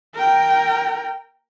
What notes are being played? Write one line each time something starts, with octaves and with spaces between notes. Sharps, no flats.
A#4 G5